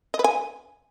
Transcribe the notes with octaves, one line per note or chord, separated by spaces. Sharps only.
D#5
B4
G#5